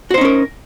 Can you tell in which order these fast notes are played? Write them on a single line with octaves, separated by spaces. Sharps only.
F#4 C5 D#4 C#4 A#4